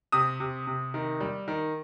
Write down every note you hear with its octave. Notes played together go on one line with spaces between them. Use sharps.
C3 D#6
C3
C3
D#3
G3
D#3